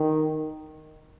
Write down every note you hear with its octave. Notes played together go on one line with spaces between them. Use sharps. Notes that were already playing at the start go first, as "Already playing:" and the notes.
Already playing: D#3